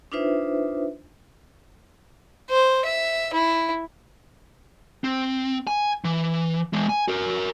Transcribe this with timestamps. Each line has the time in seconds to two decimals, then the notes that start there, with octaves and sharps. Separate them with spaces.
0.12 D4 D#4 F4 B4 C5 E5
2.50 C5
2.85 E5
3.34 E4
5.04 C4
5.67 G#5
6.05 E3
6.73 E3 G#3
6.89 G#5
7.08 F#4 A#4